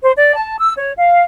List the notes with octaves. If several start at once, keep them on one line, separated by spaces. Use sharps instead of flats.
C5
D5
A5
E6
C#5
F5